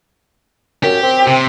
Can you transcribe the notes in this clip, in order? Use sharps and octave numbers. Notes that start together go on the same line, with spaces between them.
F#2 G4
C4
C3